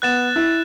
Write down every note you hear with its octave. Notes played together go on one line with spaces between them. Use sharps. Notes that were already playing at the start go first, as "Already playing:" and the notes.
B3 F#6 A6 E7
E4